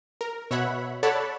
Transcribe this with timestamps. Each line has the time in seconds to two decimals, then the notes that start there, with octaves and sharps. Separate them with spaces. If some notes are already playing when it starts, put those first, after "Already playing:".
0.21 A#4
0.51 B2 C#5 E5 F#5 B5
1.03 A4 C#5 D5 F#5 A5 B5